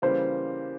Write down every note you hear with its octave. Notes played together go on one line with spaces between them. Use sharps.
C#3 E3 G3 A#3 C5